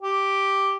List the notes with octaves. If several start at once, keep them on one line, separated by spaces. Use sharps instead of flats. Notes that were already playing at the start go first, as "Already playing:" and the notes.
G4